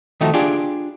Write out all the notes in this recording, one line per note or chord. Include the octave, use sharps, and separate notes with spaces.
D#3 F3 A3 D#4 F#4
D4 F4 G4 G#4 D5